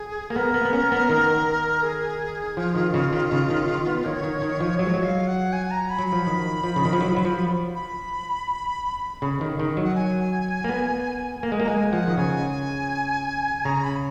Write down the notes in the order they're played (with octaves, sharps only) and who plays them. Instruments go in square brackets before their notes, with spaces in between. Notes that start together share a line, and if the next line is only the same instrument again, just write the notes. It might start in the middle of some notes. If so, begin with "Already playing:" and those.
Already playing: [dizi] G#4
[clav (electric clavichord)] A#3 [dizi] G#4
[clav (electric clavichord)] B3 [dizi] A#4
[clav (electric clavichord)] B3
B3
C#4
B3
D#3
[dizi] G#4
[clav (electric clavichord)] F3 [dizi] F4
[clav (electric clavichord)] D#3
C#3
D#3
C#3
D#3
D#3
B3
[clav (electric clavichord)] D#3 [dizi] C#5
[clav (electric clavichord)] D#3
D#3
F3
[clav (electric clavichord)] F#3 [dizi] C#5
[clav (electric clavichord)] G#3
F#3
[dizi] F5
F#5
G#5
A#5
B5
[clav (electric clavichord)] F#3
[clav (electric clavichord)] F3 [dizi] B5
[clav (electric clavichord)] D#3
F3
C#3
D#3
F3
F#3
F#3
F3
[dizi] B5
[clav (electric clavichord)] C#3
D#3
D#3
F#3
[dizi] F#5
G#5
[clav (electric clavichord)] A#3
B3
A#3
G#3
A#3
[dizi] A#5
[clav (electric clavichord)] G#3 [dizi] G#5
[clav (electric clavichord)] F3 [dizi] F#5
[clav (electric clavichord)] D#3
[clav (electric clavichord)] C#3 [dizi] G#5
[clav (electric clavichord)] C#3 [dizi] A#5
[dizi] B5